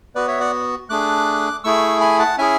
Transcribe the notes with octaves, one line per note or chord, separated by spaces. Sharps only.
B3 F#4 B4 D5
C#5 E5
D5 F#5
A3 D4 G#4 D6 F#6
A3 E4 G#4 C#6 E6
G#5 B5
F#5 A5
C#4 E4 G#4 E5 G#5